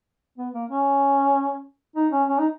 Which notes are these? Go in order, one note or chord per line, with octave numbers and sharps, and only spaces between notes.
B3
A#3
C#4
D#4
C#4
C#4
D#4